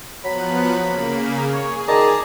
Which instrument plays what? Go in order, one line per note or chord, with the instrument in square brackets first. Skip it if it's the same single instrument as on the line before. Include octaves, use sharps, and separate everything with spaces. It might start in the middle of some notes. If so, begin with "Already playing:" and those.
[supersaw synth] F3 B3 F#6 [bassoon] F#3 [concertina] B5
[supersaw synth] C#3 A#3
[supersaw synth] G#4 [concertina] C#5
[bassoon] D#3 [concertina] D5 A5 A#5